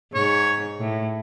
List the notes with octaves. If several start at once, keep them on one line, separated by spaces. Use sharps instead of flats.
G#2 C#5
A2